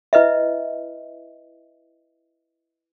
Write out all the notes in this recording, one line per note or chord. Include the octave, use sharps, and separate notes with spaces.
E4 B4 D#5 E5